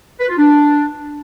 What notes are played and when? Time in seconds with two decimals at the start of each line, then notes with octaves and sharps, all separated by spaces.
0.20 B4
0.29 F4
0.38 D4